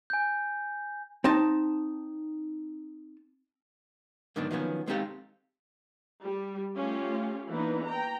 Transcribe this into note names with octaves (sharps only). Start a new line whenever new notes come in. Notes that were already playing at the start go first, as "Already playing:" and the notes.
G#5 G6
C4 D#4 A5
G#2 D3 D#3 F#3 B3 D4
D#3 F3 F#3 B3 C#4
G#3 C4 D#4 G4 A4 F5
G3
A3 C#4 F4 G4
E3 A#3 B3 D4 D#4
G5 A#5